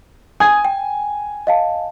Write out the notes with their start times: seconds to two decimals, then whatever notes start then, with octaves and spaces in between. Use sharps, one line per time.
0.40 G#5 D#6 G#6
0.65 G5
1.47 D#5 F5 A5